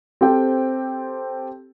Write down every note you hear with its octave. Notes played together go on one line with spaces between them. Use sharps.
C4 G4 A4 C5 G5